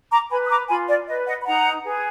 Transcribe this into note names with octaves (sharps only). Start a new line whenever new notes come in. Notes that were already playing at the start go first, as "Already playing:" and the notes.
A#5 D6
B4 G#5 B5
D#6
A#5 D6
F4 G#5 B5
D5
B4 D#5
D#5 F#5
B5
D#4 F#5 A#5
G#4 B4